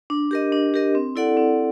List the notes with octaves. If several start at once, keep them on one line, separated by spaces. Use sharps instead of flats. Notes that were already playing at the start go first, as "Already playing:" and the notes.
D4
G4 A#4 D#5
D4
G4 A#4 D#5
C4
E4 A4 D5 F#5
C4